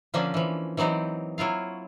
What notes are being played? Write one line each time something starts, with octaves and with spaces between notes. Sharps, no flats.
D3 F3 A#3 C#4 D4
E3 F3
E3 F#3 C4 D#4 G4
F#3 E4 F4 F5